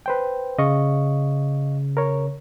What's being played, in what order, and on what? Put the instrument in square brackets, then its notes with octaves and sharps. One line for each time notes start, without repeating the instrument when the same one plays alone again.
[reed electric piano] B4 C5 G5
[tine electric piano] C#3 [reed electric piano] D#5 F5 C#6
[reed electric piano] A#4 C#5